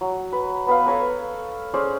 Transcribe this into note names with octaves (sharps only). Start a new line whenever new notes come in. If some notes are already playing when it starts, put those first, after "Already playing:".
F#3
B4
B3 B4 F5
A4 B4 C#5 A#5
C#4 G#4 C5 D5